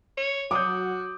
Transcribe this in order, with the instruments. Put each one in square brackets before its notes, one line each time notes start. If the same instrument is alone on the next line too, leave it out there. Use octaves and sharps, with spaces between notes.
[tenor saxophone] C#5
[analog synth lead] F#3 [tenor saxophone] F#4 [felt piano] D6 D#6 G6